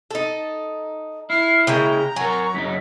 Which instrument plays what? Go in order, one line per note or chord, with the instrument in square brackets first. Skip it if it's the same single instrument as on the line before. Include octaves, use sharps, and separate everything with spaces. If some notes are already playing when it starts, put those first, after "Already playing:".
[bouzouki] D#4 A4
[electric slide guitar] E4 [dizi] F6 [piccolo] C7
[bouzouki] C#3 G#3 A#3 [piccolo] G5 [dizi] A#5
[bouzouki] F#3 [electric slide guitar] A#4 G#5 [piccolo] C#6
[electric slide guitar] F#2 C#3 D#4 [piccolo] B6